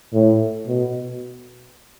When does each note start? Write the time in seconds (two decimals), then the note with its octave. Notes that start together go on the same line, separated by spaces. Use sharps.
0.13 A2
0.67 B2